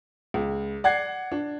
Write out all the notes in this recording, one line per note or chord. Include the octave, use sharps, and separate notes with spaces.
C#2
D5 F#5 G#6 C7
D4